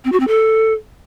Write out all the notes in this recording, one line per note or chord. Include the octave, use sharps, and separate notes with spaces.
C4
F#4
C4
A4